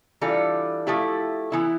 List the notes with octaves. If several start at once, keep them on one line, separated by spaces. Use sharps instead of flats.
E3 G3 D4 F4 A4
F3 A3 E4 G4
E3 B3 E4